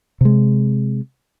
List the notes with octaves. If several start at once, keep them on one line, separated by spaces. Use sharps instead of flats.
C3 G#3